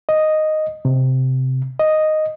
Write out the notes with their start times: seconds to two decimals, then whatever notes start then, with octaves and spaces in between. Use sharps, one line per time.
0.09 D#5
0.85 C3
1.79 D#5